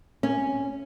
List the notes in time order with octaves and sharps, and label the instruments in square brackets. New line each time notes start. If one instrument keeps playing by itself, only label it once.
[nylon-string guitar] C#4